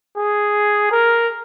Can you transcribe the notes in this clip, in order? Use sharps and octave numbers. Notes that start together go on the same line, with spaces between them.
G#4
A#4